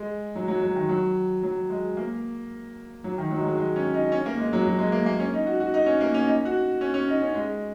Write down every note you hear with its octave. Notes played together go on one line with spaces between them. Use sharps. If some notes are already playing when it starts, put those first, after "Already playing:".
Already playing: G#3
F#3
F#3
F#3
D#3
F#3
F#3
G#3
A#3
F#3
D#3
F#3
G#3
F#3
G#3
C#4
D#4
C#4
A#3
G#3
F#3
F#3
G#3
A#3
A#3
C#4
D#4
F#4
F#4
D#4
C#4
A#3
C#4
D#4
F#4
C#4
C#4
D#4
C#4
G#3